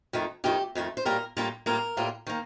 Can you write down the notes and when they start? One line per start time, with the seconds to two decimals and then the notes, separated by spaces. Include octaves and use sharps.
0.13 F2 D#3 A3
0.44 F2 D#3 A3 G4
0.75 F2 D#3 A3
0.97 C5
1.05 A2 G3 A#3 F4 A#4
1.37 A2 G3 A#3 F4
1.66 A2 G3 A#3 F4 A#4
1.97 A2 G3 A#3 F4
2.27 D#3 A#3